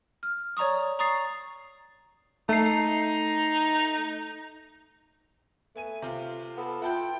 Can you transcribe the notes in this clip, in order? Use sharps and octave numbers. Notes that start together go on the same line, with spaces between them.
F6
C#5 D5 A#5 C#6 D#6
A#5 C#6 D#6 A6 C7
A3 D#4 C7
A3 B3 G#5 D#7
C3 F4
B3 A4
E4 F4 F#5 G5 A5 G6